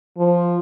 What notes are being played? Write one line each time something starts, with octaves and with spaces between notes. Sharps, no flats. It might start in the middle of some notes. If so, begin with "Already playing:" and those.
F3